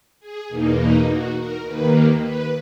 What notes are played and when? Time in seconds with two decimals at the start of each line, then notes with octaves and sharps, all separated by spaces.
0.20 G#4
0.49 E2 B2 A#3 D#4
0.77 D#4
1.07 F#4
1.36 A#4
1.64 D#2 D#3 A#3 B4
2.23 B4